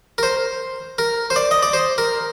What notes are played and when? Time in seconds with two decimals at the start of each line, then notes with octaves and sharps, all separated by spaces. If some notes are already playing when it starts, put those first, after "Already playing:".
0.18 A#4
0.23 C5
0.98 A#4
1.30 C5
1.36 D5
1.51 D#5
1.63 D5
1.73 C5
1.98 A#4